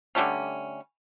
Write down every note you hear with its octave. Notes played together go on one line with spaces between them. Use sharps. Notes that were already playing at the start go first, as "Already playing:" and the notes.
D3 G3 A3 C#4